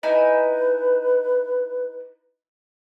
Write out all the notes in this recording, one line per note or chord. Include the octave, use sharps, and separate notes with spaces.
D#4 E4 B4 G#5